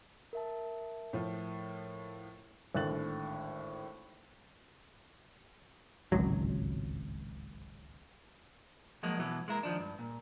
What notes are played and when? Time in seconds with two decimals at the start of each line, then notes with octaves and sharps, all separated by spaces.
0.33 A#4 E5 A5
1.13 A2 F3
2.75 G#1 A2 D3 F#6 A6 F#7
6.12 D1 G#1 C#2 F#3
9.03 F3 F#3 G#3 A#3
9.19 B2 E3 F#3 B3
9.48 G#3 A#3 E4 A#4
9.63 D#3 F3 D4
9.80 G2
9.99 A#2